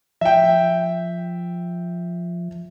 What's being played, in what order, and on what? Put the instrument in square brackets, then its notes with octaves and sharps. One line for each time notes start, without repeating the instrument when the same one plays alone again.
[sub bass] F3 [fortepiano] E5 G5